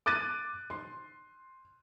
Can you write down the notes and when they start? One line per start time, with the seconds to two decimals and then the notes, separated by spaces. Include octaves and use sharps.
0.06 D6 F#6 A6 D#7
0.70 C6